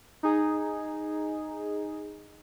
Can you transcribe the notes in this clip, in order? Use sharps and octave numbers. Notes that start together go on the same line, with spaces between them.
D#4 G#4